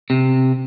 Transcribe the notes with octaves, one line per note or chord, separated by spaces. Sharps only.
C3